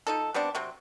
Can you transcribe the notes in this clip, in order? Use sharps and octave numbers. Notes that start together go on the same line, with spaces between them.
F3 D#4 A4
G3 B3 C4 D4
C3 F#3 C4